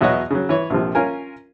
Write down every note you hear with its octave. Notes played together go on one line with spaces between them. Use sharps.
E2 B2 F#3 C#5 D#5 F#5
C#3 F#3
E3 C#5
A#1 C3 F3
C#4 F4 A#4 G#5